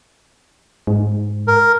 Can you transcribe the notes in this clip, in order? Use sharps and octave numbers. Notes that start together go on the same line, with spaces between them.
G#2
A#4